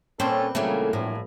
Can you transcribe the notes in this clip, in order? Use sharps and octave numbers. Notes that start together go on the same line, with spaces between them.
A#2 C4 C#4 A4 B4 C5
A#2 C#3 E3 F#3 A3 A#3
A#1 A2 F3